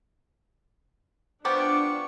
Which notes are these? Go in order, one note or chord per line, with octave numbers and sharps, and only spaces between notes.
F3 B3 D4 G4 C#6 D6